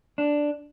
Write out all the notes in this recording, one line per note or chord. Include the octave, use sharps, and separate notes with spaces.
D4